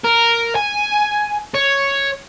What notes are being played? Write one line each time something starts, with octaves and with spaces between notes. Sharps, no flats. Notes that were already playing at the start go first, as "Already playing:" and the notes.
A#4
G#5
C#5